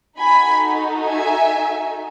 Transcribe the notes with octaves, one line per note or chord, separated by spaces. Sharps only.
D#4 F#4 A4 G#5 B5
E5 G#5